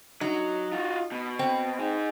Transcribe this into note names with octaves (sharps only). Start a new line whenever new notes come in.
F#3 D#4
F4 F#4
B2
C4
D#4 G#4